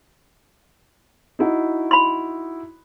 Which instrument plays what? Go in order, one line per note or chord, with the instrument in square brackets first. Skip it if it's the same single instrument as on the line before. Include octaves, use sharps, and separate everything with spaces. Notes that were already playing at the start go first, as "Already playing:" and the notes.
[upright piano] D#4 E4 F#4
[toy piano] B5 C6